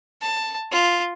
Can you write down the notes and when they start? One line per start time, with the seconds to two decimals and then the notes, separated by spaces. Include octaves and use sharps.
0.22 A5
0.71 F4